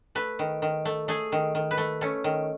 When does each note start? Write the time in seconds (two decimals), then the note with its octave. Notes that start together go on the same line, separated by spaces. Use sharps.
0.15 A3 B4
0.39 D#3
0.62 D#3
0.85 A3
1.08 A3 G#4
1.32 D#3
1.55 D#3
1.71 B4
1.78 A3
2.01 A3 C#4
2.24 D#3